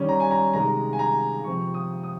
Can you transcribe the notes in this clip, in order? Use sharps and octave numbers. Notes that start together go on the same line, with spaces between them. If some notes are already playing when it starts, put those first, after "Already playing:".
Already playing: D#3 G3 C#4
A#5
G#5
A#5
C3 D#3 G#3 A#5
G#5
A#5
C3 F3 C4 C#6
D#6
D#6